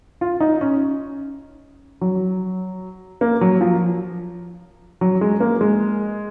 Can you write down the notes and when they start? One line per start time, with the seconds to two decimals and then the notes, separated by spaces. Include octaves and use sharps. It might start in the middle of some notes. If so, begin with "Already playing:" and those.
0.21 F4
0.41 D#4
0.61 C#4
2.01 F#3
3.21 A#3
3.41 F#3
3.61 F3
5.01 F#3
5.21 G#3
5.40 A#3
5.61 G#3